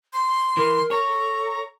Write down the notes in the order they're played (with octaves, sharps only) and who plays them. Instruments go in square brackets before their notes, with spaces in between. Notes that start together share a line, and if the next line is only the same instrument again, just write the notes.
[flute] C6
[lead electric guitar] E3 [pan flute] A#4
[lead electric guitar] C#5 [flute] A#5
[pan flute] A4